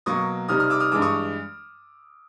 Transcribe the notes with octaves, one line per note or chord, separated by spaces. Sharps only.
B2 F#3 A#3 C#6 D#6
C3 D#3 G3 D#6 F6
D#6 F6
D6 E6
D#6 F6
G2 E3 G#3 D6 E6
C#6 D#6